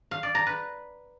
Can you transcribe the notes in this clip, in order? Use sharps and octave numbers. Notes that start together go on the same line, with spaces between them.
F5
D5
A#5
B4